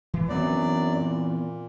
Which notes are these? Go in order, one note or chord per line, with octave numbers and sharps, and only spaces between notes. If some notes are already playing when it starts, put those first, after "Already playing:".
E3
F#2 E3 F#3 B3 C4 D5
A#2